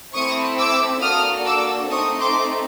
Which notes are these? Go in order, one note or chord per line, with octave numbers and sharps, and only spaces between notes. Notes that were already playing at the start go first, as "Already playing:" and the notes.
A3 C4 E4 C#6 D#6
D6 E6
A#3 D4 F#4 A4 D#6 F6
D6 E6
A3 C4 D#4 C#6 D#6
C6 D6